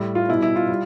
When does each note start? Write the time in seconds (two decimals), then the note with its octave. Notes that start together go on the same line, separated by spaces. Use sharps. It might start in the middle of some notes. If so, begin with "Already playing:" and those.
Already playing: A2 G3
0.15 F4
0.29 B2 G3 E4
0.42 E4
0.56 F4
0.69 G3